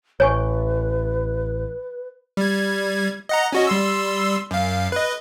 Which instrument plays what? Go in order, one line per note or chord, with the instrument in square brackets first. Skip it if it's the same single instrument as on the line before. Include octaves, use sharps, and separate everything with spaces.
[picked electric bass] A1 [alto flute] B4 [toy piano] C#5 G#5 C#6
[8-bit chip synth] G3 G#6
D#5 F#5 A#5
C#4 F#4 D#5
G3 C6 E6
F#2 F5
B4 D#5